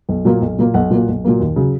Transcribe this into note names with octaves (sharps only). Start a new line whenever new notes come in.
B1
A#2 F#3 A#3
B1
A#2 F#3 A#3
B1 F#5
A#2 F#3 A#3
B1
A#2 F#3 A#3
D#2
C#3 F#3